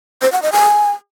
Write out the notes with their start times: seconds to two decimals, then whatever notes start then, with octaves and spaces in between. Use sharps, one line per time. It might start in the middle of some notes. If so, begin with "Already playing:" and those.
0.22 C5
0.32 F#5
0.42 D#5
0.52 G#5